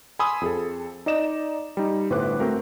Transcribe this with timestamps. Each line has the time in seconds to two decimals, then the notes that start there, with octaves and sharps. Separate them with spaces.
0.19 G#5 B5 C6 D#6 E6
0.41 F2 G#4 A4
1.06 D#4 D5 D#5 E7
1.77 G3 D#4
2.10 G1 A2 B4 C5 D6 F#6
2.40 A3 C4 F#4 A#4